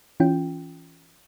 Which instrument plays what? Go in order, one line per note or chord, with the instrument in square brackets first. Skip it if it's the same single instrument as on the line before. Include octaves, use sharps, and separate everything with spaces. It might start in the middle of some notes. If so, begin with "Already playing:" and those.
[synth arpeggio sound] E3 C#4 F4 G5